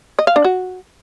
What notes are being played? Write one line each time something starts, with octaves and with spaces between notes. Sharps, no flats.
D#5
F5
D4
F#4